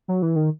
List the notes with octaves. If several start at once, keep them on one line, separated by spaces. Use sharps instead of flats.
F#3
E3
D#3